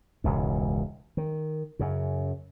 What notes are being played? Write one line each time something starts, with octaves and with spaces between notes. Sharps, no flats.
E1 C#2 G#2
D#3
F#2 C#3